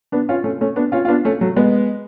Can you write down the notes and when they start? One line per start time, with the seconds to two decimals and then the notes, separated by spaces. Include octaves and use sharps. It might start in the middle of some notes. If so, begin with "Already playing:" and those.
0.12 B3 D4
0.29 C#4 F4
0.44 A3 C#4
0.61 A3 C#4
0.76 B3 D4
0.92 C#4 F4
1.05 F4
1.08 B3 D4
1.25 A3 C#4
1.41 F#3 A3
1.56 G#3 B3